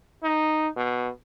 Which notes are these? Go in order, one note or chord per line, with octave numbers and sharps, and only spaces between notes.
D#4
B2